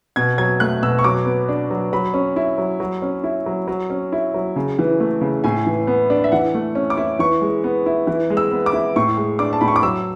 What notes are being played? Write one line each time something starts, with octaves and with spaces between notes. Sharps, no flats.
B2 G#6
F#3 G#6
A3 F#6
B2 E6
C#6
F#3 D6
B3
D4
F#3
F#3 B5
C#4
E4
F#3
F#3
C#4
E4
F#3
F#3
C#4
E4
F#3
C#3
E3
A3
C#3
A2 G#5
E3
B3
D4
E5
E3 F#5
A3
C#4
D6
E4
E3 C#6
G#3
B3
E4
E3
G#3
E6
B3
D6
E4
A2 C#6
G#3
D4 D6
A5
A2 B5
C#6
D6
F#3 E6